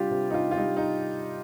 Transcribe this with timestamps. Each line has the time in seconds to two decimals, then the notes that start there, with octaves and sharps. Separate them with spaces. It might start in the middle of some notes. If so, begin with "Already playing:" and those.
Already playing: C3 G3 D4 F4 G4
0.11 C3
0.30 D#4
0.34 C3 F4
0.51 F4
0.57 G3 D#4
0.77 D#4